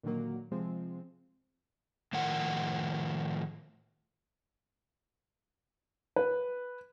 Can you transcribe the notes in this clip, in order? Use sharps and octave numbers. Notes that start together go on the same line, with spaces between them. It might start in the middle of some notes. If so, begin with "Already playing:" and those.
A#2 D3 D#3 F#3 A#3
C3 F3 G#3 C4
A2 D#3 F3 A#4 F#5
B4